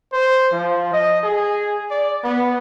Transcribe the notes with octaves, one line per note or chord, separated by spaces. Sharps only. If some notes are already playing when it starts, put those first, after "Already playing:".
C5
F3
D#5
G#4
D5
B3